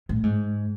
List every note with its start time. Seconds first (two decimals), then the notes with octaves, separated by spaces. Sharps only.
0.09 A2
0.23 G#2